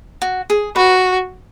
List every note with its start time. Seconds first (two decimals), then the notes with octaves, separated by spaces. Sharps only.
0.22 F#4
0.50 G#4
0.76 F#4 B4